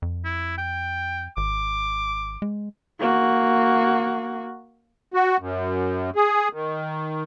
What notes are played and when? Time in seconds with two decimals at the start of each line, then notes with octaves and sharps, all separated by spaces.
0.02 F2
0.25 E4
0.58 G5
1.37 G#1 D6
2.42 G#3
3.00 A#3 F#4
5.14 F#4
5.40 F#2
6.16 G#4
6.53 D#3